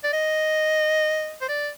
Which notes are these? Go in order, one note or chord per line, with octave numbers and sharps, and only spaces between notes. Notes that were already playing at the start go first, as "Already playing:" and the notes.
D5
D#5
C5
D5